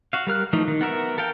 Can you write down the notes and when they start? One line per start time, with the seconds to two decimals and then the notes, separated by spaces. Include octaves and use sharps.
0.13 F#4 F5
0.27 G3 A#4 F6 F#6
0.53 E3 F3 A3 D#4
0.68 D#3
0.81 B3 F#4 A#4 E5
1.18 A4 A#4 F5 G5